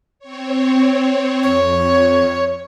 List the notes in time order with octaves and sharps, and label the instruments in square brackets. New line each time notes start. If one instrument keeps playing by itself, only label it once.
[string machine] C4 C#5
[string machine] F2 [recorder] C#5